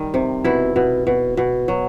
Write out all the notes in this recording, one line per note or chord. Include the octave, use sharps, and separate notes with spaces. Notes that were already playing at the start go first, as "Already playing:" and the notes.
Already playing: D#3 G3
C3
B2 E4
B2
B2
B2
F#3